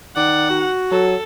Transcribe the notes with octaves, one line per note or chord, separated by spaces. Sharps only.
D#3 D5 F#5
F#4
F#3 A4